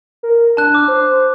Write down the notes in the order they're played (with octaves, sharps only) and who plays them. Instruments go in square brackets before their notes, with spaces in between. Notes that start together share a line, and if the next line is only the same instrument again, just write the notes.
[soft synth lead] A#4
[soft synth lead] D4 [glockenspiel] A5 F#6
[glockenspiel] D6 F6
[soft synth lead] C5